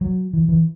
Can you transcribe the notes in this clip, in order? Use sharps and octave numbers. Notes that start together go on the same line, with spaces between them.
F#3
E3
E3